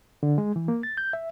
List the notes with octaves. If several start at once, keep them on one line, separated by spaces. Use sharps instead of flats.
D3
G#3
E3
A#3
A6
G6
E5